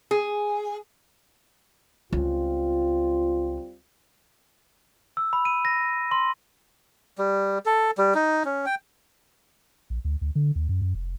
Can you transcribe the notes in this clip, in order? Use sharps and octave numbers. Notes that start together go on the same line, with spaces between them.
G#4
C#2 G3 C4 F4
E6
B5
D#7
A#6
C6
G3
A4
G3
D#4
C#4
G5
A#1
D2
D2
D3
D#2
F#2
F#2
F1